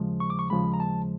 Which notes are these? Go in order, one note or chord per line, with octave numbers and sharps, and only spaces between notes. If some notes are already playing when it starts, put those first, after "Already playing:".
Already playing: D#2 C#3 F3 G#3
C#6
D6
C#6
D#2 C#3 F3 G#3 B5
A#5
A5